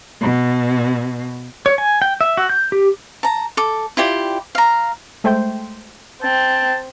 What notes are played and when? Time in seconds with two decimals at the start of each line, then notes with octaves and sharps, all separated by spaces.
0.21 B2
1.66 C#5
1.78 G#5
2.02 G5
2.21 E5
2.37 F#4
2.50 G6
2.72 G4
3.23 A5 A#5
3.57 A4 D6
3.97 E4 F4 G4 D5
4.55 F5 A#5
5.24 G#3 A3 C5 G5 C6 G6
6.22 C4 A5